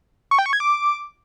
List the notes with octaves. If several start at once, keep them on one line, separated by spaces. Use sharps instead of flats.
C#6
G5
C#6
G#6
D6